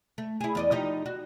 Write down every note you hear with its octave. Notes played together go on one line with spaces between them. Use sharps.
A3
E4 G#4
E2 D5 D#5
F3 D#4 G4
F#4